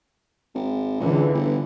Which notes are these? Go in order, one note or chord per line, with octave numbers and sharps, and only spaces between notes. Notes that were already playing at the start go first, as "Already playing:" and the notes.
G#1
C#2 D3 E3
G1